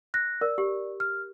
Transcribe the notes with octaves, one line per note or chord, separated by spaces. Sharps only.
F#6 A#6
A#4 D5
G4
F6